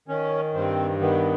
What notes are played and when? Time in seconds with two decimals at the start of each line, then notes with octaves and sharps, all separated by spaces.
0.08 D#3 C#4
0.54 G2 C4
1.00 D#3 B3